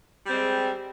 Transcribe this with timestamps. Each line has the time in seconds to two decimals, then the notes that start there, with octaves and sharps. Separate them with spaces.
0.24 G3
0.28 C4
0.31 G#3